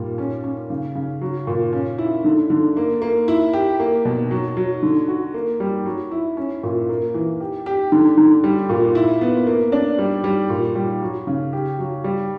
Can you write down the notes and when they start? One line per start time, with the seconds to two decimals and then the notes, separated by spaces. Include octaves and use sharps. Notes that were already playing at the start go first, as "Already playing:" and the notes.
Already playing: A#2 G3
0.18 C#4
0.44 C#4
0.70 C#3
0.95 C#3
1.21 F#3
1.47 A#2
1.73 C#4
1.98 E4
2.24 D3
2.50 D3
2.77 A#3
3.02 A#3
3.28 E4
3.53 G4
3.80 A#3
4.05 B2
4.31 F#3
4.57 F#3
4.83 D3
5.08 F#4
5.34 A#3
5.60 G3
5.86 F#3
6.11 E4
6.37 C#4
6.63 A#2
6.89 A#3
7.14 E3
7.40 G4
7.66 G4
7.92 D3
8.17 D3
8.44 G3
8.70 A#2
8.95 E4
9.21 B3
9.47 A#3
9.72 D4
9.98 G3
10.24 G3
10.50 A#2
10.75 G3
11.02 F#3
11.27 C#3
11.53 G4
11.79 F#3
12.04 G3